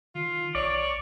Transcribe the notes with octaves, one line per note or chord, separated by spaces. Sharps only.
D#3 F4
B1 C#5 D5